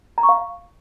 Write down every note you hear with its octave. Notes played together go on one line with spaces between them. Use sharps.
A#5
C#6
F5